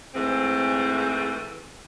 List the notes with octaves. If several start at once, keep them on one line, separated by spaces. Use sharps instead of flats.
G#2 E3 A3 C4